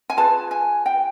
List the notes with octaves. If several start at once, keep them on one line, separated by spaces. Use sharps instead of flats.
G#5
F4 G#4 B4 A5
G#5
G5